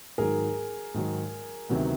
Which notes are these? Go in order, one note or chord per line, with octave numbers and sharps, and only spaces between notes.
G#2 D#3 F#3 G#4 A#4
G#2 D#3 F#3
D2 C3 D#3 F#3 B3